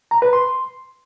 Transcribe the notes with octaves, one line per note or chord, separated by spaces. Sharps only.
A#5
B4
C6